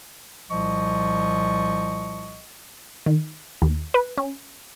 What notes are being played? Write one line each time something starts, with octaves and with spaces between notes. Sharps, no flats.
C2 A#2 F3 D#5 C#6
D#3
D#2
B4
C#4